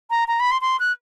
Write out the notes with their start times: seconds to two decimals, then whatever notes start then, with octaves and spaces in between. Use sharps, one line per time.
0.10 A#5
0.28 A#5
0.40 B5
0.51 C6
0.61 C6
0.80 F#6